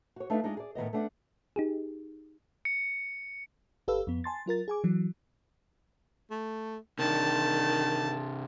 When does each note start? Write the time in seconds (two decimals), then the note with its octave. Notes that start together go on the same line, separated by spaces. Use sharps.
0.16 F#4 C#5
0.30 A3 D4 D#4 B4 F5
0.43 G#3 D4 D#4 F4
0.57 G#4 D5
0.75 A2 D#3 B3 D#5
0.93 A3 B3 D4 F#5
1.56 D#4 G4 G#4
2.65 C#7
3.88 G1 G4 A4 B4 F5 E6
4.07 F2 B3
4.24 G#5 A5 C6 A6
4.46 F#3 F4 A#4 A6
4.68 G#4 G#5 D6
4.84 E3 F#3
6.31 A3
6.99 C3 D#3 D4 A5